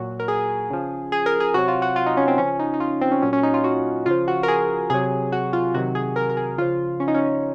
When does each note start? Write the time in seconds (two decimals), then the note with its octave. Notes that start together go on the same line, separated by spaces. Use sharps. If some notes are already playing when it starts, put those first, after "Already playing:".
Already playing: A#2 F#3 F#4
0.20 A#4
0.28 G#4
0.70 C#3 F3
1.12 G#4
1.26 A#4
1.40 G#4
1.54 C3 F#3 F#4
1.68 F4
1.82 F#4
1.96 F4
2.06 D#4
2.17 C#4
2.28 C4
2.38 C#3 F3 C#4
2.59 D#4
2.74 D#4
2.80 F4
3.01 C4
3.12 C#4
3.22 A#2 F#3 C#4
3.33 C#4
3.43 D#4
3.54 F4
3.64 F#4
4.06 C#3 F3 F4
4.28 F#4
4.43 A#4
4.48 G#4
4.90 C3 F#3 G#4
5.32 F#4
5.53 F4
5.74 C3 D#3 F#3 F#4
5.95 G#4
6.16 A#4
6.29 A#4
6.37 G#4
6.58 C#3 F3 F4
7.00 C#4
7.08 D#4
7.15 C#4